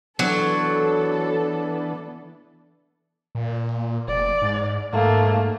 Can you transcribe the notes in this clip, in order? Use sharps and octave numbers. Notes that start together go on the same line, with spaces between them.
E3 F#3 B3 D4 A4
A#2
F1 D5
G#2
G#2 A3 A#3